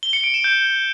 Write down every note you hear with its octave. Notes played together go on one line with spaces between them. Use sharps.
G7
C#7
D7
E7
G6